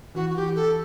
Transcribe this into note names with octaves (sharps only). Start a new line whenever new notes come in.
E3 F#4
F#4
G4
A4